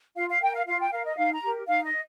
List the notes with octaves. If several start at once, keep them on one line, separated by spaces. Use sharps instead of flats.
F4 F5
F5
A#4 G5
F5
F4 F5
G5
A#4 F5
D#5
D#4 F5
A#5
G4 A#4
D#4 F5
D#5